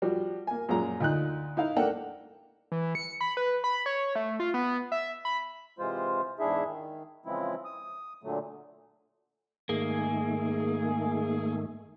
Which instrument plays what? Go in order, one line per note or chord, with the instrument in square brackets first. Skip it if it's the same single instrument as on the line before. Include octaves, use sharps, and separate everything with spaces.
[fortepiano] F3 G3 F#4
A#3 G#5
F#2 A#2 F3 G#3 F4 A#5
D2 D#4 F4 F#6
D#4 E4 F5
A3 A#3 D4 A4 F#5 G5
[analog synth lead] E3
C#7
B5
B4
B5
C#5
A3
F4
B3
E5
B5
[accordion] C3 E3 G#3 F4 C5
E2 G#2 D4 E4 G#4 E5
D#3
C#3 E3 F3 G#3 C4 E4
D#6
A#2 D3 F#3 A3
[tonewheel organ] G#2 D#3 A3 [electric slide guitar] A#3 [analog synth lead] G#4